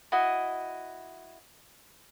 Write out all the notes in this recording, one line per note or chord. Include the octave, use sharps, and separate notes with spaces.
E4 F#4 D#5